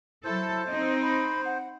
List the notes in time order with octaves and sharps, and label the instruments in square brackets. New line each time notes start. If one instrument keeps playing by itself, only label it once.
[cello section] F#3 A4 [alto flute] E4 [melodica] C5
[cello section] C4 D#4 [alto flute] D#5
[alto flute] B5
F#5